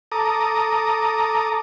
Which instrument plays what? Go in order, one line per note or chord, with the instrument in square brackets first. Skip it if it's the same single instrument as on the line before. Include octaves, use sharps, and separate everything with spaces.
[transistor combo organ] A4 A#5 D6 D#6